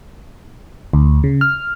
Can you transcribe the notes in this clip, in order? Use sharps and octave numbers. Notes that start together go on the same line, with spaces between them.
D2
C#3
F6